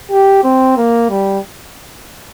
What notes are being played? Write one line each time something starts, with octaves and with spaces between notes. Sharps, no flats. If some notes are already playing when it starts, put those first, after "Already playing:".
G4
C4
A#3
G3